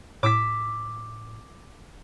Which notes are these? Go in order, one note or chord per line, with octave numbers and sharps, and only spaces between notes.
A2 D6 E6 B6